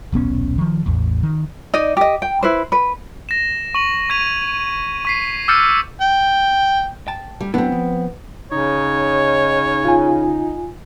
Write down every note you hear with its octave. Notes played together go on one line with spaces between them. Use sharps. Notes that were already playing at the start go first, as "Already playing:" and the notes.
D#1 B1 B3 C#4
D#3 F3
A1 E2
D#3
D#4 D5 D#5
G4 D#5
G5
E4 B4 C5
B4
A#6 E7
C#6 F#7
C#6 G#6 A#6 B6 D#7 F7
C#6 B6 C7
D6 E6 F6 G6 A6 C#7
G5
G5 A5
G3
F#3 B3 C4 D4 E4
F3
C#3 D#4 C#5
F4 G#5